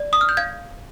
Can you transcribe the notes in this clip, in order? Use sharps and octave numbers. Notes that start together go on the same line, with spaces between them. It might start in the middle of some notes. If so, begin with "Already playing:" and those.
Already playing: D5
D#6
F6
G6
F5 G#6